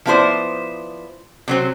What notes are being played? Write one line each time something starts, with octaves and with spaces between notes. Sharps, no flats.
F3 B3 E4 G4 C5 D5
C3 F#3 C4